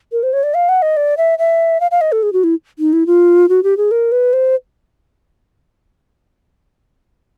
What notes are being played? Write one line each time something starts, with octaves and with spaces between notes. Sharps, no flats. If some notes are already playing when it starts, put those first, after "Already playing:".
A#4
C5
C#5
D5
F5
F#5
D#5
D5
E5
E5
F5
F5
D#5
A4
G#4
F#4
E4
D#4
E4
F4
F#4
G4
G#4
A#4
B4
C5